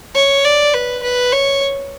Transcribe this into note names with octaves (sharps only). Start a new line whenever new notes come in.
C#5
D5
B4
B4
C#5